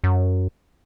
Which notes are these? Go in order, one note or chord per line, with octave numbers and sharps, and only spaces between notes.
F#2